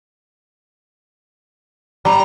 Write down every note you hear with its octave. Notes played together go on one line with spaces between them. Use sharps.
G3 A#5